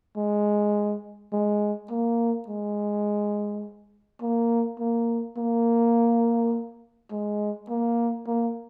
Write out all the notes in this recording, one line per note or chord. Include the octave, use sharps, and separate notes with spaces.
G#3
G#3
A#3
G#3
A#3
A#3
A#3
G#3
A#3
A#3